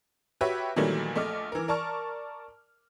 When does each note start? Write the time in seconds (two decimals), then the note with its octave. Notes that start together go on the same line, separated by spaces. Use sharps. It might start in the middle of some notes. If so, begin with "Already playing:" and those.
0.41 F#4 G4 B4 C#5 E5
0.76 A#2 D#3 E3 F#3 G3 A3
1.16 A#1 A3 D#5 D6 F6
1.52 E3 A#4
1.68 A#4 D5 A5 C#6 F6